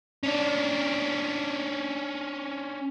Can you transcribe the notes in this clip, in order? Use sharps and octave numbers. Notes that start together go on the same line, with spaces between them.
C#4 D4